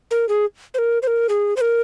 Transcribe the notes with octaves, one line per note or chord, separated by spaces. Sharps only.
A#4
G#4
C5
A#4
C5
A#4
G#4
C5
A#4